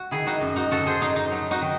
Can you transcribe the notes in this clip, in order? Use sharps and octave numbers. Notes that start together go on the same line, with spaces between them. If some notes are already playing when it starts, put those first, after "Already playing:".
Already playing: F#4
D#3 E4 G#4
D#4 F#4
F#2
D#4 F#4
F#2 F#4 A4
G#4 C5
F#3 D#4
D#4
F#3
D#4 F#4
D#3